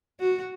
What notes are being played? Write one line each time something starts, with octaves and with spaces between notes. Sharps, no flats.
F#4